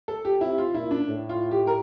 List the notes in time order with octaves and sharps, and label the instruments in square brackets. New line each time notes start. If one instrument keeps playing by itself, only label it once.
[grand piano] A4
G4
[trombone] C3 [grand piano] E4
[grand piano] F4
[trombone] A#2 [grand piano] E4
[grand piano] D4
[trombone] A2
[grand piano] F4
G4
A#4